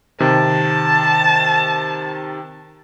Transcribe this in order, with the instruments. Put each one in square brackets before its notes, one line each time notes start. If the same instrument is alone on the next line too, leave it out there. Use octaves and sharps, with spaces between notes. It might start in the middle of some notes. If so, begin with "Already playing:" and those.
[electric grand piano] C3 D#3 [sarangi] A5